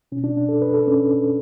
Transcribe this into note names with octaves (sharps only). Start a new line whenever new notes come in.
B2 C#4
D4
D4
A4
B4
A4
C#4